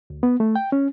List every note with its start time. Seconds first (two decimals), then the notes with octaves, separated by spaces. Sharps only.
0.10 D2
0.23 B3
0.40 A3
0.56 G5
0.72 C#4